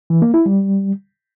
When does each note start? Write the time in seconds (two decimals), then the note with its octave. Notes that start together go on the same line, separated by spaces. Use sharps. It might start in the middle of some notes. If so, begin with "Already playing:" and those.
0.10 E3
0.22 A#3
0.34 E4
0.46 G3